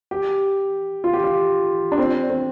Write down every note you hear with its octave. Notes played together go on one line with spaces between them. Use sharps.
G4
F4
G4
F4
D4
C4
C4